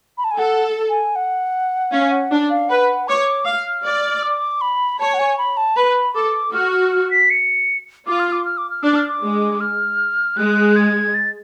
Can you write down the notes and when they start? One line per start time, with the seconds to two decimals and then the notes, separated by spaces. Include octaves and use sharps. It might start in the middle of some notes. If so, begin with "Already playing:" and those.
0.18 B5
0.24 A5
0.31 G#5
0.38 A4 F#5
0.90 G#5
1.16 F#5
1.92 C#4 F5
2.12 F#5
2.31 D4
2.50 F5
2.69 B4 F#5
3.08 C#5 D6
3.45 F5 F6
3.85 D5
4.23 D6
4.61 B5
5.00 C#5 A5
5.14 F#5
5.19 G#5
5.38 B5
5.57 A5
5.77 B4 B5
6.15 A4 D6
6.53 F#4 F6
6.73 F6
6.92 F6
7.11 B6
7.30 C#7
8.07 F4 D6
8.19 F6
8.32 D6
8.45 F6
8.58 D6
8.70 F6
8.83 D4 D6
8.96 F6
9.08 D6
9.23 G#3
9.60 F6
10.37 G#3 F#6
10.76 G#6
11.14 A6